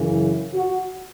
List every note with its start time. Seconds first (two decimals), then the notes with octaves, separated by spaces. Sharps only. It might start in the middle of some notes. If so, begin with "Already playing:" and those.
Already playing: F#2 C#3 E3
0.54 F#4